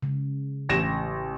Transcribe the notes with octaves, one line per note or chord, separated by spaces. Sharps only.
C#3 G#3
A1 A#6 E7